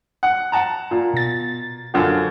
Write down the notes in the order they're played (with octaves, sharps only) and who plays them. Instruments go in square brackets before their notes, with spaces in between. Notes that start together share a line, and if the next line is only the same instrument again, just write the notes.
[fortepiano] F#5
F#5 A5 A#5
A#2
[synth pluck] B2 A6
[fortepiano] F#2 D3 F3